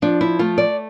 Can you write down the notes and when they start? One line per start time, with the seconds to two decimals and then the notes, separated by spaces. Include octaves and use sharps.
0.02 F3 D4
0.21 E4
0.39 A3 F4
0.58 D5